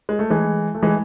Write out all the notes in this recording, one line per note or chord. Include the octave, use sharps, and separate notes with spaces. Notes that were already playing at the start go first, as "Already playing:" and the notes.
G#3
A3
E3 G#3
A3
E3 G#3